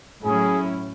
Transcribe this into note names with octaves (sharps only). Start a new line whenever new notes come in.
A2 F#3 C#4 E4 G#4